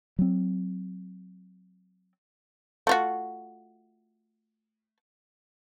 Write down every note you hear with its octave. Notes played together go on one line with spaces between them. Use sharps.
F#3 C4
A3 F4 F#4